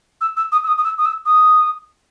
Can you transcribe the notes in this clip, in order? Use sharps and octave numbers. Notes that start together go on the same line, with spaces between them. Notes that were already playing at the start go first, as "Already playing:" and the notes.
E6
E6
D#6
E6
D#6
D#6
E6
D#6
E6
D#6